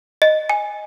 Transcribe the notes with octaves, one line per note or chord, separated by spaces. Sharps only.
D#5
G#5